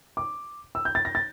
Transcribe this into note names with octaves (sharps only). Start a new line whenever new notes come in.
D6
E6
G6
A6
A#6
A6